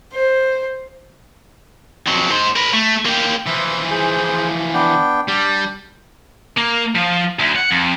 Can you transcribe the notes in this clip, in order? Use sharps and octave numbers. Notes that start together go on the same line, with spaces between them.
C5
F2 F#3
G#2 C5
A#4 B4
A3
A#3 G4
E3 F3 E6
G#4 C5
B3 D4 G5
G3 D4
A#3
F3
D2
F#5
F2